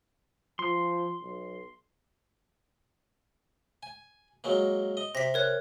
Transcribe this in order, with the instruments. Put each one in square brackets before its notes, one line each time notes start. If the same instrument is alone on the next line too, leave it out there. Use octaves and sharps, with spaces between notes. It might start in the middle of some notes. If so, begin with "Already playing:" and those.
[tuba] F3 [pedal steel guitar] C6
[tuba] B1
[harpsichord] G#5
F#3 G#3 A#3
D#5
[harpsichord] C3 [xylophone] A#6 B6
[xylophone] A#4 C#5 F#6